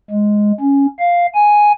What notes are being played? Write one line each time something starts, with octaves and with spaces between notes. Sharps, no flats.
G#3
C#4
F5
G#5